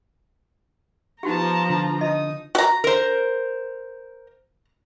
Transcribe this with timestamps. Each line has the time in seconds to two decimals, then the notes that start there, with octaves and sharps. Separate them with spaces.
1.23 F3 B3 D#4 F#4 G4 A5 A#5
1.70 D3
2.01 D#4 D#5 D#6
2.55 F#4 A#5
2.84 A#4 C5